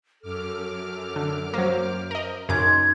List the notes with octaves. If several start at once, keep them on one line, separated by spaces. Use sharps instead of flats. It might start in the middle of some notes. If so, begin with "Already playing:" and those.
F#2 A4 D6 F6
D3
F#3 A#3 C5
A#4 D#5
F#2 C#3 D#4 C6 D6 G#6